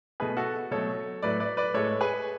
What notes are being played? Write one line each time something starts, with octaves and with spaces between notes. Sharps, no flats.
B2 A3 G#4 B4
F#4 A4
B2 F#3 A3 A4 C#5
A2 F#3 A3 B4 D5
B4 D5
B4 D5
A2 G#3 A4 C#5
G#4 B4